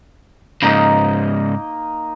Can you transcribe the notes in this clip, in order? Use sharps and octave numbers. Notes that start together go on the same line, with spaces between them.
G#2 C#3 A#3 D#4 D#5